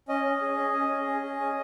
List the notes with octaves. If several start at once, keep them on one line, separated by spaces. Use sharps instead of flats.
C#4 D#5
C#4
G#4
C#4
C#4
G#4
C#4
G#4
C#4